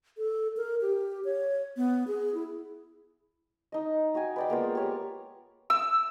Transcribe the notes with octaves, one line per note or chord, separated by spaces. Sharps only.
A4
A#4
G4
C#5
B3
G#4
E4
D#4 D#5
D#4 F#4 G5 G#5
B4 D5 G5
G#3 A#3 B3 F4
G4 C#5 A#5
E6